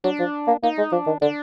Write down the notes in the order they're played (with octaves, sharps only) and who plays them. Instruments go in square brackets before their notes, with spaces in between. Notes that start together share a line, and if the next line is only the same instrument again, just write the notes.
[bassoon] F#3 [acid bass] D4
[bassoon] F3
A#3
[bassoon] A#3 [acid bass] D#4
[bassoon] G#3
[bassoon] F3 [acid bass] D4
[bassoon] D#3
[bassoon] D3 [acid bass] D4